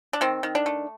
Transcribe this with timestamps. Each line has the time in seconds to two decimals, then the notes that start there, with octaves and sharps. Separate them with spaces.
0.13 D4
0.21 D#3 C4
0.43 D#3
0.55 D4
0.66 A3